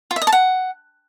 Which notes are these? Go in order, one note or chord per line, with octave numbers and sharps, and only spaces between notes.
F4
E5
D#5
A5
F#5